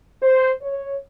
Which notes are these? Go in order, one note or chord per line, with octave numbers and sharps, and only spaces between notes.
C5
C#5